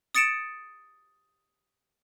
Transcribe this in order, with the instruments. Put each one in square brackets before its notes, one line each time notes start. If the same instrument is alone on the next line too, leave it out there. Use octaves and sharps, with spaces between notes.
[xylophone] D#6 A6 C#7 D7 E7